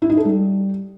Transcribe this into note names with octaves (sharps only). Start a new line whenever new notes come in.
E4
D#4
A4
G3